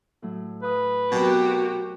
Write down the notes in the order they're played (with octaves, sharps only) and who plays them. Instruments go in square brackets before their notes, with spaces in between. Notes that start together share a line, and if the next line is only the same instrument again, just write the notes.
[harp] A2 F#3 A3
[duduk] B4 [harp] F5 D#6
[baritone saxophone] B2 [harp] F#3 B3 C4 [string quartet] F#4 G4 A#4